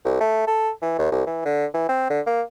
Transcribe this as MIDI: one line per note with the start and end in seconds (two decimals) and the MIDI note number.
0.05 0.18 36
0.20 0.47 57
0.47 0.70 69
0.82 0.98 52
0.98 1.11 39
1.12 1.24 36
1.26 1.44 52
1.45 1.66 50
1.74 1.85 52
1.89 2.08 60
2.10 2.20 50
2.26 2.42 58